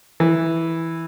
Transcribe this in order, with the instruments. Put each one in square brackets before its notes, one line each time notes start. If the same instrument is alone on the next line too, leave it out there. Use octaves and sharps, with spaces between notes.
[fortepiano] E3